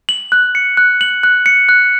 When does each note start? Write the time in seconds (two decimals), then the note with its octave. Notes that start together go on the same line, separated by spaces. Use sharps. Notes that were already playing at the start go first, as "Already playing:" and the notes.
0.09 F#7
0.32 F#6
0.55 C#7
0.77 F#6
1.01 F#7
1.23 F#6
1.46 C#7
1.69 F#6